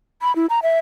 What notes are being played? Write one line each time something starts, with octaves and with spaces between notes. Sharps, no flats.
B5
E4
A#5
E5